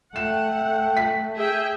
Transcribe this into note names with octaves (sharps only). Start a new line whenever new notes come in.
A3 F#5 G5 E7
B6
G#4 E5 G5